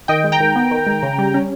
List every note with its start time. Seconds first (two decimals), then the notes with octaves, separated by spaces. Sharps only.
0.08 D#3 D#5 G5
0.24 G#3
0.32 G5 A#5
0.40 D#3
0.56 B3
0.71 D#3
0.87 G#3
1.03 C#3
1.18 G3
1.34 C#4